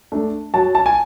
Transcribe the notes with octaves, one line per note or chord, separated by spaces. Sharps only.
A3 D4
F#3 A5
A5
G#5